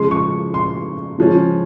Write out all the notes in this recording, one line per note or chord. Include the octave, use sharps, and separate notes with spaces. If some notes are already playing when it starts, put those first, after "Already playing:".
Already playing: C#3 F3 G#3 C6
C#6
C6
C#3 F3 G#3 C#4